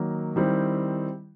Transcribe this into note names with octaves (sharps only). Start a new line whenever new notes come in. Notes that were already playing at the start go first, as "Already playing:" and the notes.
Already playing: D#3 F#3 A#3
D#3 G3 C4 E4